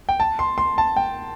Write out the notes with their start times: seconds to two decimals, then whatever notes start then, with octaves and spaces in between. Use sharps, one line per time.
0.09 G5
0.20 A5
0.39 C6
0.58 C6
0.78 A5
0.96 G5